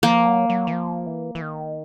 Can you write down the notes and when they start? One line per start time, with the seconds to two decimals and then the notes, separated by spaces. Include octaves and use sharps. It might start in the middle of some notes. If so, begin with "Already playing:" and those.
0.03 F3 A#3
0.27 F#3
0.49 F#3
0.67 E3
0.72 F3
1.06 E3
1.35 E3
1.42 D#3